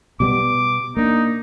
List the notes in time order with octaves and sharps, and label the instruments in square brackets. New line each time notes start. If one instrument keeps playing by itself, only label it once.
[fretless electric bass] B2 G3 B3 [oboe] D6
[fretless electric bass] A#3 D4 [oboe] D#4